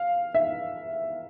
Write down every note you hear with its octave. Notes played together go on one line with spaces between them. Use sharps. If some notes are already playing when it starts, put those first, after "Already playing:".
Already playing: F5
E5